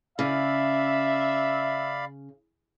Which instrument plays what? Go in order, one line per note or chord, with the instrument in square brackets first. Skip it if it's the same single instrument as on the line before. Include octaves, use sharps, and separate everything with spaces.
[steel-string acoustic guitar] C#3 [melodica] D5 F5 B5 [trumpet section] E5